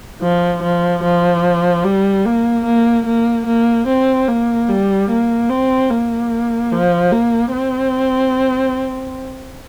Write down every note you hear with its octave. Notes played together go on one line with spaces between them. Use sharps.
F3
F3
F3
G3
A#3
A#3
A#3
A#3
C4
A#3
G3
A#3
C4
A#3
F3
A#3
C4